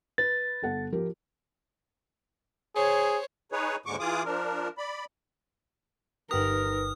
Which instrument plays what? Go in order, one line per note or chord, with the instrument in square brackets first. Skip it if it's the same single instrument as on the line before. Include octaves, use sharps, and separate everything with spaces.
[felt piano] B4 [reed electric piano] A6
[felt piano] G1 A4 F#5
F3 G4 A#4
[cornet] G#4 [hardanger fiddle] C5 C#5
[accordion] D#4 G#4 B4 C#5
D#2 G#2 D3 G#3 C#6 D6
E3 F4 G#4 D6 D#6
F3 D4 A#4
D5 B5
[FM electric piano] G1 G4 F6 [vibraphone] D#4 B4 [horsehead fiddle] A#4 [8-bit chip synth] D#6